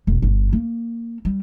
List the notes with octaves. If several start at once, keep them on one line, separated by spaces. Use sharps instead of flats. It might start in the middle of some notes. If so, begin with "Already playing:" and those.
E1
G1
A#3
G3